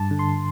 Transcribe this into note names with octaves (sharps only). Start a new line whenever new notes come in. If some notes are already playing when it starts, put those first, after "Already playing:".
Already playing: G2 A5
D3
C6